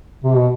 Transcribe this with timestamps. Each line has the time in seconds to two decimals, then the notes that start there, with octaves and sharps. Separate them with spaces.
0.24 C3
0.35 B2